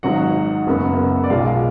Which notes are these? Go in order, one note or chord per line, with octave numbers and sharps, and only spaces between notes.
G#1 G#2 F#3 F#4 F#5
F#1 F#2 C#3 F#3 B3
D5
B1 B2 G#3 F4 F5